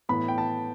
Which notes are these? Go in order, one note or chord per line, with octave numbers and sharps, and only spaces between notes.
A2 E3 B3 B5
G5
A5